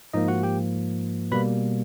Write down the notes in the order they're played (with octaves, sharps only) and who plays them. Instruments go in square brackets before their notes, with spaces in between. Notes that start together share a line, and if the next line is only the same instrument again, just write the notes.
[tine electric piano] G#2 F3 A#3 D#4 D#5
F#4 F#5
G4 G5
B2 G3 A#3 B4 B5